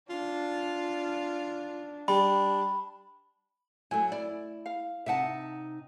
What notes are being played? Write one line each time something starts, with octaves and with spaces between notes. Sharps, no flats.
D4 F4
G3 D4 B5
F#3 A3 E4 G#5
E4 D5
F5
C3 D#4 E5 F#5 A5